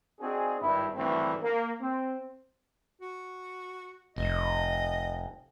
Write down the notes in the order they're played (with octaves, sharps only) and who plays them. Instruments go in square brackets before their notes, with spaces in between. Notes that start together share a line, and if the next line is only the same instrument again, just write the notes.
[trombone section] C4 D4 D#4 F#4 G#4
G#1 G2 E4
G#1 D2 G2 E3 A3 C4
A#3
C4
[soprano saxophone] F#4
[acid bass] F1 [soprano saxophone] D#5